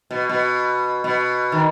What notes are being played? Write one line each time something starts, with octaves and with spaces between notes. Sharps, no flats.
B2
B2
B2
D#3